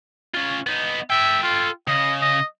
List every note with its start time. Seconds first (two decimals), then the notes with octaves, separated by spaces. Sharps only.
0.34 C#4 F4
0.66 B3 D#4
1.10 A4 E5 G5
1.43 F4
1.88 C#3 D#5
2.21 D#5